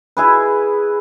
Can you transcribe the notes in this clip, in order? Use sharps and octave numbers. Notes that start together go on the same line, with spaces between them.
E4 G#4 B4